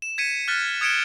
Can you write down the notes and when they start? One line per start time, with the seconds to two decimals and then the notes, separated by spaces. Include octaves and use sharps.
0.02 E7
0.18 G#6 B6 C#7 D#7
0.48 F6 F#6 A6 B6
0.81 D#6 G#6 C#7 D7 E7 G7